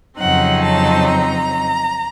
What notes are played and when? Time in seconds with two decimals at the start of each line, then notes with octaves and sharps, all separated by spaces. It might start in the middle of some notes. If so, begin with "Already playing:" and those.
0.17 F2 C#3 F#3 C4 D#4 F#5
0.61 A5
1.06 A#5